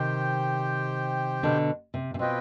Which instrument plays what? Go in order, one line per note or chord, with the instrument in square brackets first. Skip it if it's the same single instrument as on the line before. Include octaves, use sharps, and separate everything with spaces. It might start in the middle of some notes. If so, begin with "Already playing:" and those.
Already playing: [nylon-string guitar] C3 D#3 [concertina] G4 C5 G5
[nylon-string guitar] B2 D3
C3
C3
[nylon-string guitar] B2 [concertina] C4 F4 B4 D#5 G5